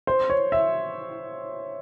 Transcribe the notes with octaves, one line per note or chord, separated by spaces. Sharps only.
C5
C#5
E5